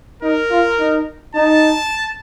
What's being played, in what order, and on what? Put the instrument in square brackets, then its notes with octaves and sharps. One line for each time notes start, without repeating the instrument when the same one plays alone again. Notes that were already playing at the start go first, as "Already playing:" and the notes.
[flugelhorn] D#4 [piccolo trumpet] A#4
[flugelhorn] F4
D#4
[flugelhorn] D#4 [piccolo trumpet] A5